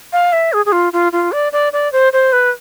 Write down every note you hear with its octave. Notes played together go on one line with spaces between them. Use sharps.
F5
E5
G#4
G#4
F4
F4
F4
D5
D5
D5
C5
C5
B4